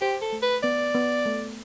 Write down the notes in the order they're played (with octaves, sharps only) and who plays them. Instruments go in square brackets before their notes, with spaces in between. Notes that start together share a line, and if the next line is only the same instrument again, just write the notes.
[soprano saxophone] G4 [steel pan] C5
[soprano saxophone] A4
[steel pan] A3
[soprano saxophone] B4
[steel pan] B3 [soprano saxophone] D5
[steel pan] B3
A3